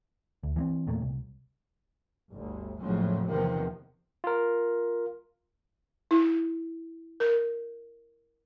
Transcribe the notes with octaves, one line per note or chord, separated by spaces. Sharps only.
D2
E3 A#3 C4
E2 A#2 A3 A#3
C2
G1 D2
A#1 F2 A2 C#3 F3 F#3
E2 C3 D#3 F3 A#3
F4 A#4
E4
A#4